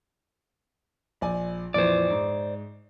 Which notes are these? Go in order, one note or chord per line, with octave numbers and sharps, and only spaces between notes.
A#1 D5 G#5
F2 A#2 E3 C5 D5
G#2